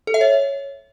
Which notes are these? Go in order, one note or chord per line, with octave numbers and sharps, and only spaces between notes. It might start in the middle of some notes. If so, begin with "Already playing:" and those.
A4
E5
C#5